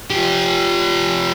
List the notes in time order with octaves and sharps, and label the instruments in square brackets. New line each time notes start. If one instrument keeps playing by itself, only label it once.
[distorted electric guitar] F3 G4